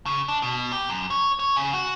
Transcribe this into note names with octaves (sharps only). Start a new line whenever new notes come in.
C#3
D4
B2
G4
F#2
C#5
C#5
C#3
F#4